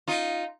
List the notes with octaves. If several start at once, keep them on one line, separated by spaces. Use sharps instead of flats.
D#4 F4